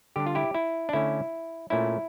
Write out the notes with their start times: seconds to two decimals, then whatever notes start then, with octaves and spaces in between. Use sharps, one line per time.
0.16 D3 G3 D4 G4
0.26 F4
0.35 E4 G4
0.54 E4
0.89 D4
0.93 D3 A3 C#4 E4
1.70 A#2 A3 C#4 E4